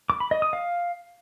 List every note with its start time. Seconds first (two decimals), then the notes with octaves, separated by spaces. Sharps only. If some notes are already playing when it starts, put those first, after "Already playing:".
0.10 D6
0.20 B5
0.31 D#5
0.42 D#6
0.53 F5